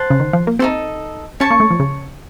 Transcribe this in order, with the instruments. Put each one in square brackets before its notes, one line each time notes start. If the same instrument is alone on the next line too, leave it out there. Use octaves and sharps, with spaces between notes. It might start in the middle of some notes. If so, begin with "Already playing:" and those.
Already playing: [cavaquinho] C5 F#5 A5
[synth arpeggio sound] C#3
D#3
F3
A#3
[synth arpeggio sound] C4 [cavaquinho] D#4 F#4 A4
[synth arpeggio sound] C#4 [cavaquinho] C#5 A5 C#6
[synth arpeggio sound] A#3
A3
F3
C#3